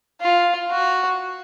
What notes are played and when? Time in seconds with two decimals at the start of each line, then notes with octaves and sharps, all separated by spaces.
0.21 F4
0.71 F#4